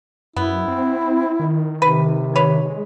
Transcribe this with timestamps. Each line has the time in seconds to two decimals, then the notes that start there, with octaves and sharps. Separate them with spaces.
0.36 F#2 B3 E4
0.68 C4
1.40 D#3
1.82 C3 B4
2.36 B4 C#5
2.65 G#3